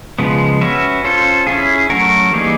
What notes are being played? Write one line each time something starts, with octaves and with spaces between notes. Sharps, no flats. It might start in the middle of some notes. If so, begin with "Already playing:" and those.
C#3 F3 G#3 B3
C#4 F#4 B4 E5
C#4 F4 A4 C5
C#4 E4 G#4
F#3 A3 C#4 F#4 A#4
E3 G3 A#3 D#4 G#4